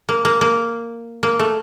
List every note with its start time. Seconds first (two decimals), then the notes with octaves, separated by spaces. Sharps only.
0.09 A#3
0.25 A#3
0.41 A#3
1.23 A#3
1.39 A3